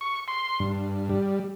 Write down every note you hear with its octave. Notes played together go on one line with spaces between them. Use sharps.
C#6
C6
G2
G3